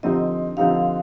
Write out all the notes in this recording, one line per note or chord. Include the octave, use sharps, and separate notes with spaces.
D3 F3 C4 D#4 G4 D#5
D3 F3 C4 D#4 G4 F5